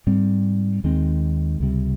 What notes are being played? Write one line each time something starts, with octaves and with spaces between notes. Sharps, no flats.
G#2 G3 C4
D#2 D#3 G#3 C4
C#2 C3 G3